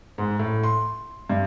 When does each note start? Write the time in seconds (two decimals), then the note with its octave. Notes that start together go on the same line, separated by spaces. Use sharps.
0.18 G#2
0.39 A2
0.63 C6
1.30 G2